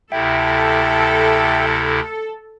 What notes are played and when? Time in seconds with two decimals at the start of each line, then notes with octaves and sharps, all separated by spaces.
0.12 D2 C3 E4 A4 E5 G5